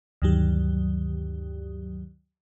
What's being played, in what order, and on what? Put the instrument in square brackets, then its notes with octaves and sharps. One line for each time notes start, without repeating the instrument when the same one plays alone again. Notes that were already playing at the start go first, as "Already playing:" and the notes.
[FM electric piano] D2 G2 D#3 F#3 G4